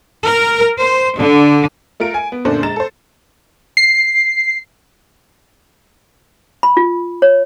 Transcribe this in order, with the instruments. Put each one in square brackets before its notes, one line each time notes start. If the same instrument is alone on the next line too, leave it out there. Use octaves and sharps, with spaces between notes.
[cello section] A#4
C5
D3
[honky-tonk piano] A3 F4 A#4 D7
G#5
B3
F#2 A#2 D3 D4 A4 C5
G#3 A#5 A6 E7
A4 C5
[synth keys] C7
[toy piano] B5
F4
C#5